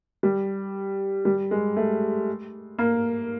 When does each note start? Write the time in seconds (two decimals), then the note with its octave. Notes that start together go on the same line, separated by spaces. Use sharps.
0.23 G3
1.25 G3
1.51 G#3
1.77 A3
2.78 A#3